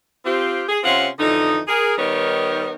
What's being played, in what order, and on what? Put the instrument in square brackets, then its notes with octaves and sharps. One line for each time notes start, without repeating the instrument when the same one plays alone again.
[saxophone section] C4 F4 G4
G#4
C3 C4 C#4 F4 F5 F#5
F2 D3 E3 D#4
G#4 A#4
D#3 G3 B3 D#4 A#4 C#5